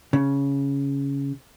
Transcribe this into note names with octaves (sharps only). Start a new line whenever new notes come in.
C#3